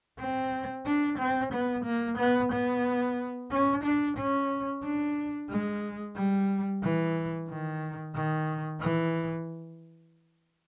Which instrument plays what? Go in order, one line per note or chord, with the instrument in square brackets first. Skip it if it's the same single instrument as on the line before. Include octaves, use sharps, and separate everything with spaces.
[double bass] C4
D4
C4
B3
A#3
B3
B3
C#4
D4
C#4
D4
G#3
G3
E3
D#3
D#3
E3